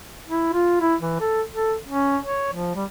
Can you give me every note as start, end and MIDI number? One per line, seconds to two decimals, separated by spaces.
0.29 0.52 64
0.53 0.79 65
0.81 0.95 64
1.01 1.17 52
1.20 1.42 69
1.54 1.75 69
1.87 2.18 61
2.23 2.49 73
2.53 2.75 53
2.75 2.85 55